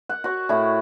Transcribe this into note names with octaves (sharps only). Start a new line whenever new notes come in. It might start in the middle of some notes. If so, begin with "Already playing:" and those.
F#5
F#4 C#5
A2 E4